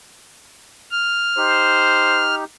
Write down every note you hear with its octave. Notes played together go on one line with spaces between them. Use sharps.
F6
D#4 G4 C5